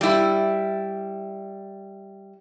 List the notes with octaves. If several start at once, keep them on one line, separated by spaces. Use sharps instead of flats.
G3 E4